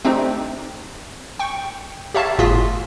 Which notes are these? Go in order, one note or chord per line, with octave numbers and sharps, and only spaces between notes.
A3 C4 D4 D#4 G4
G5 C#6
G4 C#5 E5 F5 A5
G1 A2 F4 F#4 G#4 B6